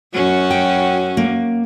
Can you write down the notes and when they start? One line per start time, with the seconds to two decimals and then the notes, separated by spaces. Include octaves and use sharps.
0.14 F#2 C#4 F#4
0.51 G5
1.17 A#3